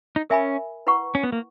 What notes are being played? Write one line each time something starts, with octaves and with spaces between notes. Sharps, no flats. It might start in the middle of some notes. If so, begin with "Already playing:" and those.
D#4
C#4 A#4 E5 G#5 B5
E4 B4 F#5 C#6
C#4
B3
A#3